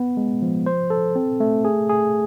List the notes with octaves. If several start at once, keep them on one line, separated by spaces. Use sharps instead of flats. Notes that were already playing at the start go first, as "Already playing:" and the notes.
Already playing: B3
G#3
F3
C5
A4
C4
A3
G#4
G#4